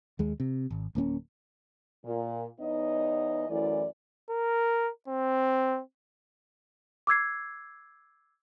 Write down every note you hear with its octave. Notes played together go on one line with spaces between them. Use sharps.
D#2 G#3
C3
G#1
D1 A#3 C4 C#4
A#2
E2 B3 D#4 C#5 D#5
F#2 E3 A3 E4 D5
A#4
C4
D6 E6 G#6 C7